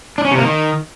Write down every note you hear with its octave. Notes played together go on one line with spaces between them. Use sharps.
D4
C#4
C3
A#3
D#3